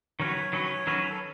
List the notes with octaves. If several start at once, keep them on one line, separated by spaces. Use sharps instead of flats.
D#3 F#3 C#4 F#4 B4 C#5
D#3 F#3 C#4 F#4 B4
D#3 F#3 C#4 F#4 B4
A4